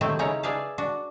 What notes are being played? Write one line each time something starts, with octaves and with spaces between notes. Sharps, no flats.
C3 D#3 F#3 A3 C4 E4
C#3 C#4 D#4 E4 C#5 A#5
G#4 B4 D5 E5 F5 A5
D4 F#4